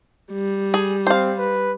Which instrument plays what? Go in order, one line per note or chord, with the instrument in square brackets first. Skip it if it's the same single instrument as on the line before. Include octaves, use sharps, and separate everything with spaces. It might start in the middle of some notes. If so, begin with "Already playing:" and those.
[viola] G3
[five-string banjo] G#4
[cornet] C4 [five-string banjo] C5 F5
[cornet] B4